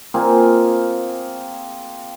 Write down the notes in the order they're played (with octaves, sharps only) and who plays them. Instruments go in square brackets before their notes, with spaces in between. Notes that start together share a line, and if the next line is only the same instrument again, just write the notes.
[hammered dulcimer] A#3 C4 F4 G#4